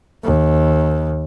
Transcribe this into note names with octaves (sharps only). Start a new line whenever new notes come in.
D#2